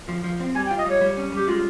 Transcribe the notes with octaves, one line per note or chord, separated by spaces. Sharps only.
F3
F3
C4
G3 G#5
G5
F4
D#5
G3 C#5
G3
C#4
G3 G4
G#3 F4